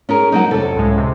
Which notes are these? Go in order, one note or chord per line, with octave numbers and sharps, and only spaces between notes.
C#4 G#4 A#4
F#3 A#3 D#4
F2 C3 C#4 A4
C#2 A2 G#3
C3